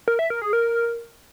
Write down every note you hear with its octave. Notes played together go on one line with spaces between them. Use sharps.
A#4
E5
A#4
G#4
A#4